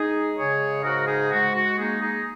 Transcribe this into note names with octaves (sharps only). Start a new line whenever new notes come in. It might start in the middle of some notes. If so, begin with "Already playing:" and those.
Already playing: G#3 D#4 G#4
C#3 G#4 C#5
G#2 F#4 A#4
D#4 G#4
G#3 F#4
F#4
A#3 D#4 G#4
D#4 G#4